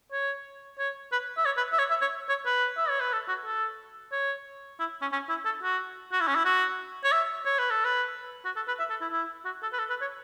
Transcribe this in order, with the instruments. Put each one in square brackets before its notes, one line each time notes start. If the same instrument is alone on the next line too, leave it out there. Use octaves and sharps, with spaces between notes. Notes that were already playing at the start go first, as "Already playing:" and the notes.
[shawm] C#5
C#5
B4
E5
C#5
B4
E5
C#5
E5
C#5
C#5
B4
E5
C#5
B4
A4
F#4
A4
C#5
E4
C#4
C#4
E4
A4
F#4
F#4
E4
C#4
E4
F#4
C#5
E5
C#5
B4
A4
B4
F#4
A4
B4
E5
A4
E4
E4
F#4
A4
B4
A4
B4
C#5